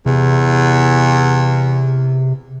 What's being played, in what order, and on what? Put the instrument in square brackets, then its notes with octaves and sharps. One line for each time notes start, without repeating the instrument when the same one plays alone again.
[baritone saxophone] E2 [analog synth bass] C3